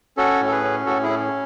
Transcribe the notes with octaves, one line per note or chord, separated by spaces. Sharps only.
C#4 F#4 A4
A2
A4
G#4 B4
C#4
A2 F#4 A4
E4 G#4
C#4